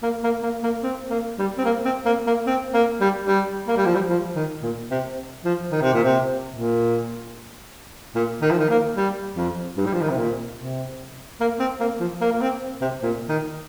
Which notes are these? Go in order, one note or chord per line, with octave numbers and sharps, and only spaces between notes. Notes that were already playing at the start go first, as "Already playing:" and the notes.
A#3
A#3
A#3
A#3
C4
A#3
G3
C4
A#3
C4
A#3
A#3
C4
A#3
G3
G3
A#3
G3
F3
G3
F3
D#3
A#2
C3
F3
D#3
C3
A#2
C3
A#2
A#2
D#3
F3
D#3
A#3
G3
F2
G2
G3
F3
D#3
C3
A#2
C3
A#3
C4
A#3
F3
A#3
A#3
C4
C3
A#2
D#3